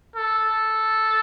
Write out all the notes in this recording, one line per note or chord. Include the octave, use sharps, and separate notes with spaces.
A4